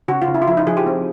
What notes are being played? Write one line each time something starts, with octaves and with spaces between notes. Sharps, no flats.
C#3 F#4
F4
C#3
E4
F4
F3 E4
D#4
F3 G#4
G4
C4